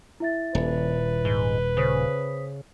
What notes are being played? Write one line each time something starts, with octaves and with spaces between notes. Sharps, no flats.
E4 E5 A6
D#1 B4
G#2 G7
C#3 C5 D#6 B6